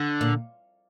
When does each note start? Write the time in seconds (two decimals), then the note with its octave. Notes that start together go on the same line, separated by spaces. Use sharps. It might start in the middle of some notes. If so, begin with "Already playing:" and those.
Already playing: D3
0.21 A#2